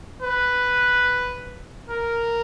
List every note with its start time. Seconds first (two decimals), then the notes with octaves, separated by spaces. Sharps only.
0.22 B4
1.90 A#4